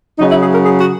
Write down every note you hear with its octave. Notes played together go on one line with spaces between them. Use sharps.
C#3 F#3 D#4
E4
G#4
A#4
G#4
F#4